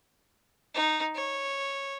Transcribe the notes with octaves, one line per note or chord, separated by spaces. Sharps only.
D#4
C#5